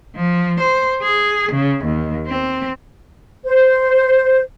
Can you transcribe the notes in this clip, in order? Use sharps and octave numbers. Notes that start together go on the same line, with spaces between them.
F3
C5
G#4
C#3
D#2
C4
C5